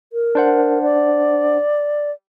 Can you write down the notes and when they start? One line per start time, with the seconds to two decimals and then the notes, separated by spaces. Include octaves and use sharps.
0.13 A#4
0.35 D4 C5 F#5
0.83 D5